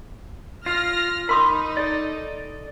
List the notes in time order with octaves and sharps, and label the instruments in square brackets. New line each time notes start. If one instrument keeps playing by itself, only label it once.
[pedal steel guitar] F4 [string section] F6 A#6
[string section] D#4 [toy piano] A#4 C6 D#6 [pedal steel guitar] B5
[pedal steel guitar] A4 D5